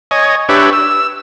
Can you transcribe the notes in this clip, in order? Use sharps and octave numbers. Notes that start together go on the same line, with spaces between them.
C#5 D#5 G#5
D4 G4 B4 C#5 E5
E6